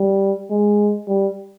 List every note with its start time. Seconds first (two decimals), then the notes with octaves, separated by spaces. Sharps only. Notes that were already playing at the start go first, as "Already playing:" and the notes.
Already playing: G3
0.50 G#3
1.08 G3